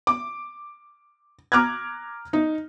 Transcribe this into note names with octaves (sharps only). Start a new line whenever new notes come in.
D6
A#5 D6 F6 F#6 G#6
D#4